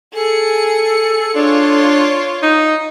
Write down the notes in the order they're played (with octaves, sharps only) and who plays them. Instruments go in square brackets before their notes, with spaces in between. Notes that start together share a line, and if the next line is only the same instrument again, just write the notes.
[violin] G#4 C#7 [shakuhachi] A4
[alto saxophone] D4 [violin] F4 C#5
[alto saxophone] D#4